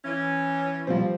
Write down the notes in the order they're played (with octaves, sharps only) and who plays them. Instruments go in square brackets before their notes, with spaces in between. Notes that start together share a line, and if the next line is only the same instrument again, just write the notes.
[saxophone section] E3 C#4
[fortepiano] F3 G3 C4